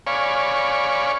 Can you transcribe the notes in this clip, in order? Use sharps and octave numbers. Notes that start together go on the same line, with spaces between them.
C#5 D5 F5 G#5 B5 C#6